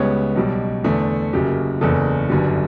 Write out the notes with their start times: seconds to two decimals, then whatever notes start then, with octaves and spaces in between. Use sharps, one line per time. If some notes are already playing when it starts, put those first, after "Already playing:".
Already playing: C#2 C#3 G3 B3 C#5
0.36 B1 B2 G3
0.84 E2 D3 A3
1.33 F#1 F#2 C#3 G4
1.81 F#1 E2 C#3 A4
2.30 G1 F#2 D3 G3